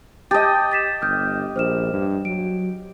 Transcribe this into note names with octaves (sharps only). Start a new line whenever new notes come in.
G4 D#5 A5 G6 A6
A6 B6 E7
G1 D#6 F6 G6
A#1 C5 F6 E7
G2
F#3 D7